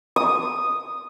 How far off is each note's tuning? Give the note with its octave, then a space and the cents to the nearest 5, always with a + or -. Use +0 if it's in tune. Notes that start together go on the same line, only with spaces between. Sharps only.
D#6 -5